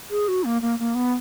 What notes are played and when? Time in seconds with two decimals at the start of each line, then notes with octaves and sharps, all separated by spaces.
0.10 G#4
0.28 F#4
0.44 A#3
0.62 A#3
0.79 A#3
0.95 B3